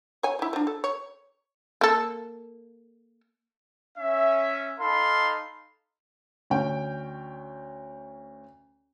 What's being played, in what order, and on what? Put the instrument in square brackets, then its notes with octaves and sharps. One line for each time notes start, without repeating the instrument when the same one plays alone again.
[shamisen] C#5 G#5
F3 E4
F3 D4
A4
C#5
A#3 A4
[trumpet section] C#4 E5
D#4 A4 F5 B5 C6
[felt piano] D2 C#4 G5